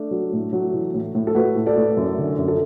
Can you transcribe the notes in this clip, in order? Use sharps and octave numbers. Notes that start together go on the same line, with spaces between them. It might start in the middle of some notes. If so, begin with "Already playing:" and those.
Already playing: A3 D4
F#3
A2
F#3
E3
A2
A2
A4
A2 F#4 B4
A2
A4 D5
A2
F#2
D3
F#2
A4